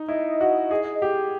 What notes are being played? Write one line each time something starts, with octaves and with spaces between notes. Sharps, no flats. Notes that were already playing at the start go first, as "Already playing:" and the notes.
Already playing: D#4
E4 D#5
F#4
G#4
G4